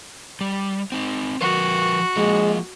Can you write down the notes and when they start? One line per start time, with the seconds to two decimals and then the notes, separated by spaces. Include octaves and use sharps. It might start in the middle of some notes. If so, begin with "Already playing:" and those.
0.41 G3
0.92 C4 D#4
1.41 F3 F#4 A#4 B4
2.17 F3 G#3 A#3 F4